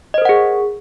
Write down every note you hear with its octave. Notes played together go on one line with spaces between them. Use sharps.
G#4 A#4 C5 D#5 F#5